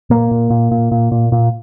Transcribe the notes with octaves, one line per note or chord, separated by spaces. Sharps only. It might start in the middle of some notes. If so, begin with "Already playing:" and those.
A#2 A#3
A#2
A#2
A#2
A#2
A#2
A#2